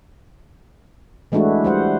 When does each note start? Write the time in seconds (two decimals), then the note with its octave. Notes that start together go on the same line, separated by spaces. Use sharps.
1.32 E3 G#3 A3 D4 E4 F#4
1.64 G3 C5 F#5